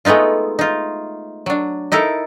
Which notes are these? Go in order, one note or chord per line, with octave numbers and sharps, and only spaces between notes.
G#3 A3 B3 D#4 F4
D#4 F4
F#3 D4
D#4 E4 A4 A#4